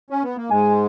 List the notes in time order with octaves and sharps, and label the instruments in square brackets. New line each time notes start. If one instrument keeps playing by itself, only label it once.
[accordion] C#4
B3
A#3
[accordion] G#2 G#3 [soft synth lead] G#5